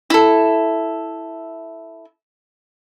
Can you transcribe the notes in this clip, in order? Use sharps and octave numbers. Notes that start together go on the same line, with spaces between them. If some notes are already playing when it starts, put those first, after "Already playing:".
E4 A4